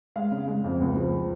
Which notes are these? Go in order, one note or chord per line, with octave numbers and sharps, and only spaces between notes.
G#3 F5
C#3
G#3
F2
C#2
F3